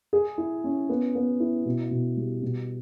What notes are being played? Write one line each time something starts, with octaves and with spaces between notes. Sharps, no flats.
G#4
E4
C#4
B3
B3
E4
B2
B2
G3
B2